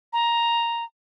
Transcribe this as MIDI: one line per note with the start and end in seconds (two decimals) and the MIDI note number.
0.13 0.84 82